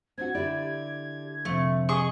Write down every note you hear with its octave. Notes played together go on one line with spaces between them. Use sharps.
C4 D4 F#4 G#6
D3 E4 G4 D5
F2 C3 A3
G#4 D#5 C#6